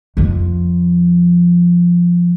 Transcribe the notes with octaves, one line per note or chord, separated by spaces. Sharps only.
F2 F3